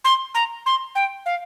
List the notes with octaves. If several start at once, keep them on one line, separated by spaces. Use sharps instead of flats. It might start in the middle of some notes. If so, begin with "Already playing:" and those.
C6
A#5
C6
G5
F5